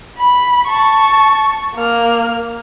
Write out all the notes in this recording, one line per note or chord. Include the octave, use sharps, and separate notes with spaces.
B5
A5 C#6
A#3 F6